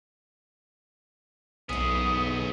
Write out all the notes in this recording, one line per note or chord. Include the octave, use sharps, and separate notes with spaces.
B1 F#2 B3 D#4 G#4 D#6